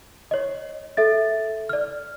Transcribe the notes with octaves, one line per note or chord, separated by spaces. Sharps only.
C#5 D#5
A4 E5 A6
D5 F6